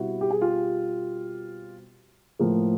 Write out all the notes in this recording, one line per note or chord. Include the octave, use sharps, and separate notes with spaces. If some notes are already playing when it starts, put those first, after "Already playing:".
Already playing: B2 G3 C4 E4 F#4
G4
G#4
F4 G4
A2 F3 A#3